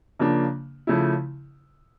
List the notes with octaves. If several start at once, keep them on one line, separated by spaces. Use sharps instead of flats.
C#3 F3 A#3 D4
C#3 F3 A3 E4